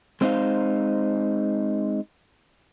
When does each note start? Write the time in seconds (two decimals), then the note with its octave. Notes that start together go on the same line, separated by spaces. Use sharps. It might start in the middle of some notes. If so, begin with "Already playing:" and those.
0.21 G#3 C4 D4 D#4 C5 F5